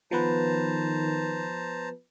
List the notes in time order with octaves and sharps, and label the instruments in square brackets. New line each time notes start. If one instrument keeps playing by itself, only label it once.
[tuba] D#3 [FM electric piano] F3 B3 B4 [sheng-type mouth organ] C5 A5 A#5